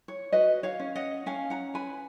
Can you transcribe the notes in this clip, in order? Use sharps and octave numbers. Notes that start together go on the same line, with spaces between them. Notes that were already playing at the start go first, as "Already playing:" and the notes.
C#5
F#4 B4 D#5
C#5 F5
C#4
D#5 F#5
C#4 F5 G#5
F#5 A#5
B4 G#5 B5